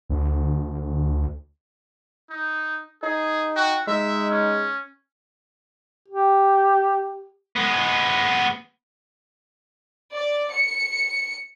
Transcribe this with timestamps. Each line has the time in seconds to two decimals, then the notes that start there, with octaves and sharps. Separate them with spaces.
0.09 D2
2.30 D#4
3.03 D#4 G#4
3.56 F#4 G5
3.87 G#3 D#4 E5
4.31 C#4
6.08 G4
7.56 G#3 B3
10.15 D5
10.54 C#7